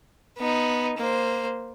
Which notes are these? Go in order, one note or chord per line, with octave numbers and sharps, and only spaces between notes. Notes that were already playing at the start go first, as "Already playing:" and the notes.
B3 D#4
A#3 C5